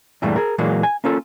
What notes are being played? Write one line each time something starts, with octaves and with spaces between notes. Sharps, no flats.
E2 G2 A#2 E3 G3 A3
G#4 A#4
A#2 E3 F#3 G#3 A#3
G#5
A#3 C#4 F4 A4